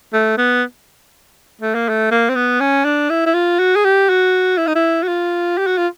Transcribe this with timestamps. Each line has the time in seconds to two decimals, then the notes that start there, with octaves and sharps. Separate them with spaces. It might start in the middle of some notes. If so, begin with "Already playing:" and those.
0.13 A3
0.38 B3
1.62 A3
1.75 A#3
1.89 A3
2.11 A#3
2.29 C4
2.36 B3
2.61 C#4
2.85 D4
3.10 E4
3.26 E4
3.34 F4
3.59 F#4
3.76 G#4
3.84 G4
4.10 F#4
4.58 E4
4.67 D#4
4.76 E4
5.03 F#4
5.08 F4
5.58 G4
5.67 F#4
5.78 F4